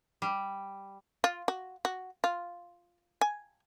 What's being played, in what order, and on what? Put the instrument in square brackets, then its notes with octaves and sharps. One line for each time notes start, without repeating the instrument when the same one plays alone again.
[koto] G3
[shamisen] F4
F#4
F#4
F4
G#5